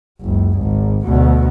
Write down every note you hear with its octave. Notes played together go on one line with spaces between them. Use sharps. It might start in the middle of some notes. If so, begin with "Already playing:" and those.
F#1 C#2
G#1
D2 B2